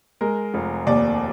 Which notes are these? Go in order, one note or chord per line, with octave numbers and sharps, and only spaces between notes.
G#3 A#4
F1
D#2 D5